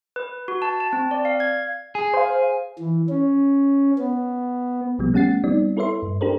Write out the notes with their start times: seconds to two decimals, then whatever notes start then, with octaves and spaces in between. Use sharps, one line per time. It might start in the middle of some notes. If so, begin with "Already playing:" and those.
0.16 B4
0.48 F#4
0.62 A5
0.80 A5
0.93 C4
1.11 D5
1.25 F5
1.40 G#6
1.95 G#4
2.14 C5 F5
2.79 E3
3.09 C#4
3.98 B3
4.99 B1 B2 F3 G3 B3
5.13 A3 C#4 G4 F#5 A6 C7
5.44 G3 B3 C4 D#4 D5
5.77 E4 A4 B4 C#5 E5 C6
6.03 G2
6.21 D4 G4 A4 A#4 C5